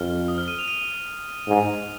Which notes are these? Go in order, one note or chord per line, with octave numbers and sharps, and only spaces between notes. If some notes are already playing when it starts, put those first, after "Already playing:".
Already playing: F2 F6
D#6
F6
D#7
F7
D#7
G#2